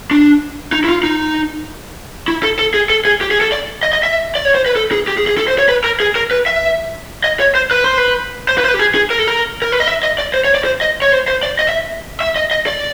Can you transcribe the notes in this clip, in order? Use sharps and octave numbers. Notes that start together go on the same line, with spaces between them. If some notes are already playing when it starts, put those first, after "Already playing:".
D4
D#4
E4
F4
D#4
E4
A4
A4
G#4
A4
G#4
G4
G#4
A4
D5
D#5
D#5
E5
D5
C#5
C5
B4
A4
G#4
G4
G#4
G#4
A4
C5
C#5
B4
A#4
G#4
A#4
B4
E5
D#5
C#5
C5
B4
C5
B4
C5
B4
C5
B4
G4
G#4
G#4
A#4
A4
A#4
A#4
B4
D#5
E5
D#5
D5
C5
C#5
D5
C5
D#5
C#5
C5
C5
D5
D#5
E5
E5
D#5
D#5
D5